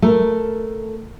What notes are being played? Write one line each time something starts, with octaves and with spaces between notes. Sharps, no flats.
A3 A#4